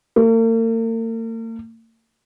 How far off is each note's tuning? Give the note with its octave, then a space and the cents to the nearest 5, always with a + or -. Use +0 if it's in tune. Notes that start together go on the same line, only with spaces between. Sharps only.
A#3 -45